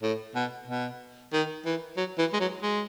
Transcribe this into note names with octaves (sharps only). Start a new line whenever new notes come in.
A2
B2
B2
D#3
E3
F#3
E3
G#3
F#3
G#3